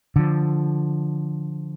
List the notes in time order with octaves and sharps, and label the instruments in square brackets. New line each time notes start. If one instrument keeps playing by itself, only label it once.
[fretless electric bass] D3 F3